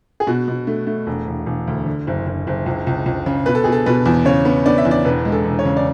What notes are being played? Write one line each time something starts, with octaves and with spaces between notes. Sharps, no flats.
G#4
B2 F#4
B2
A3
A3
E1
E1
E1
D2
D3
F#1
F#1
F#1
C#2
C#2
C#2
C#3
B2 B4
A4
B2 G#4
A4
B2 B4
E2
C#3 C#5
B3
B3 D5
E5
E2
D5
E1 B4
G#3
A4
E1
C#5
C#3
D5